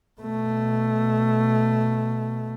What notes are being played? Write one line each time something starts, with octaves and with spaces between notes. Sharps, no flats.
B2 A3